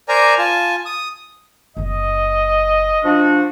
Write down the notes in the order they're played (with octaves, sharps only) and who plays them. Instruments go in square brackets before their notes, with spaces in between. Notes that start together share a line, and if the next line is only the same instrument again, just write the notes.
[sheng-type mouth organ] A#4 C5 D5 G#5 A#5
F4 G#5 A5
D#6
[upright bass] F#1 D#4 [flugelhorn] D#5
[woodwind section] F3 D4 F#4